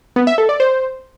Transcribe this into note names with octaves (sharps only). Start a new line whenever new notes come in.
B3
E5
A4
D5
C5